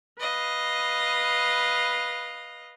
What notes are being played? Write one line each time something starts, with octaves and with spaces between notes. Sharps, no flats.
B4 D#5 F5